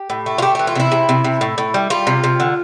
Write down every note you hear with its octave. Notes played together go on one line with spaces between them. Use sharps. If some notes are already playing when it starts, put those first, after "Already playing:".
Already playing: G4
A2
A3
F4
A3 G4
E3 G4
F4
C3 E4
C3
C3
C3
A2
A2
G3
G3 F4
C3
C3
D3